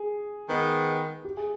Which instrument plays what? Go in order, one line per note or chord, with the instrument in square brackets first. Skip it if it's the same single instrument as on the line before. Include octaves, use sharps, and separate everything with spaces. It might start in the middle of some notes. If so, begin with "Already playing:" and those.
Already playing: [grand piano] G#4
[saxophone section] D#3 G#3 B3
[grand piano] G4
G#4